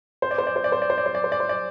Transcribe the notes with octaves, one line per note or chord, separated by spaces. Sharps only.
C5
D5
C5
D5
C5
D5
C5
D5
C5
D5
C5
D5
C5
D5
C5
D5